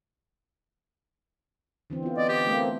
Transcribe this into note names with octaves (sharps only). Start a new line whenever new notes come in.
D3 E3 C4
B3 F4
B3 D5 D#5
G4
A3 A#3 C4